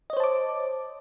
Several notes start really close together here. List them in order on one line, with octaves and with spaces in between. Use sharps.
D#5 C#5 C5 A5 D6